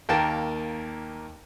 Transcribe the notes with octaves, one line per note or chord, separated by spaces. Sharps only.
D#2 A#3 A#4 G5 A5